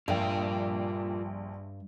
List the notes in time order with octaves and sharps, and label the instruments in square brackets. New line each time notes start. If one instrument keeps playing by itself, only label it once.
[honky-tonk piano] A#1 G5 [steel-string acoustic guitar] G2 [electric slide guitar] F4 A#4 D5